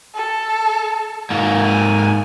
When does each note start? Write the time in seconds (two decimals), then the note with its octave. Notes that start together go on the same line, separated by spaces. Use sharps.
0.14 A4
1.30 G#2 A#3
1.64 G#5